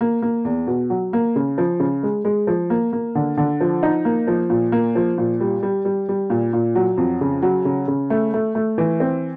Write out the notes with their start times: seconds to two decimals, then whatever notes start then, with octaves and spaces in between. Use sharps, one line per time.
0.01 A#3
0.22 A#3
0.45 E2
0.67 B2
0.90 F#3
1.13 A#3
1.36 C#3
1.58 F3
1.80 C#3
2.03 G#3
2.25 G#3
2.47 F3
2.70 A#3
2.93 A#3
3.15 D3
3.37 D3
3.61 F3
3.83 D#4
4.05 A#3
4.27 F3
4.50 A#2
4.72 A#3
4.95 F3
5.18 A#2
5.40 G3
5.62 G3
5.85 G3
6.09 G3
6.30 A#2
6.53 A#2
6.75 F#3
6.98 F2
7.21 C#3
7.42 F#3
7.65 C#3
7.88 C#3
8.10 A3
8.34 A3
8.55 A3
8.78 E3
9.00 C4